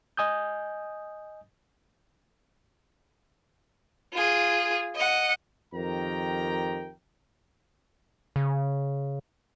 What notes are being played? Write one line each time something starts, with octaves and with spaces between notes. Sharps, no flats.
D#5 G#5 D#6 G6
F4 G#4
D#5 F#5
F2 D#3 G4 A#4 G5 A#5
C#3